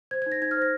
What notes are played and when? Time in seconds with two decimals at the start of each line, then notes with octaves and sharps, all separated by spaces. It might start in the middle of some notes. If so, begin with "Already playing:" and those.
0.11 C5 G#6
0.22 G#6
0.26 D#4
0.32 A#6
0.42 D#4 G#6
0.51 F6
0.57 C5
0.62 A#6